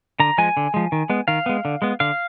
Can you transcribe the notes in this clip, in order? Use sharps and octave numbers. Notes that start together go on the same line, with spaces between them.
D3 A#5
F3 G#3 G#5
D3
F3 G#3
D#3
G#3 B3
D#3 F5
G#3 B3
D3
G#3 B3
D3 F5